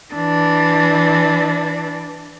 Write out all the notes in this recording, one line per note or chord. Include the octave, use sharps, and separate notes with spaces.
E3 D4